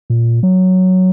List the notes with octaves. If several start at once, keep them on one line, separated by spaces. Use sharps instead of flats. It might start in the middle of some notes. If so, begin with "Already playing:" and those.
A#2
F#3